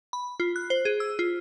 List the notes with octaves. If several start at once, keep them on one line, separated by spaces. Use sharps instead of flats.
B5
F4
F#6
C5
G#4
E6
F4